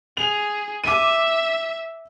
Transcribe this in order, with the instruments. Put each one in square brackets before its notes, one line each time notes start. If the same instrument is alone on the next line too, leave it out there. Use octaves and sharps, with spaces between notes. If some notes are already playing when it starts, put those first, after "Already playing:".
[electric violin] G#4 [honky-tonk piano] F7
[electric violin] E5 [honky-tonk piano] D6 D#7